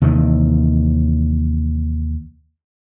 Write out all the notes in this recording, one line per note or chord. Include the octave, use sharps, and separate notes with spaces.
D#2 C3 D#3 E3